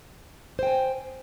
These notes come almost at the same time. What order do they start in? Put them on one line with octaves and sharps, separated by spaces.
C5 G5 G#5